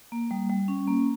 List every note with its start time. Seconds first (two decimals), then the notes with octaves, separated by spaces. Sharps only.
0.12 A#3
0.31 G3
0.50 G3
0.68 C#4
0.88 A#3